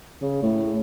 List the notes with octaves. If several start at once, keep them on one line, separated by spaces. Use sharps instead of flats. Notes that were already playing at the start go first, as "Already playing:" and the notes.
C#3
A2